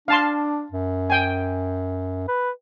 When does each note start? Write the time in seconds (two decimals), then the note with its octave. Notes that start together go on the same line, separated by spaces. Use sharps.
0.08 D4 F5 A5 C6
0.72 F#2
1.10 G5 G#5
2.28 B4